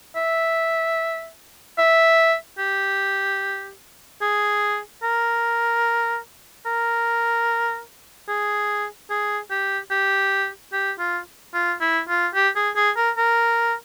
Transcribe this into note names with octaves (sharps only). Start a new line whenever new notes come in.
E5
E5
G4
G#4
A#4
A#4
G#4
G#4
G4
G4
G4
F4
F4
E4
F4
G4
G#4
G#4
A#4
A#4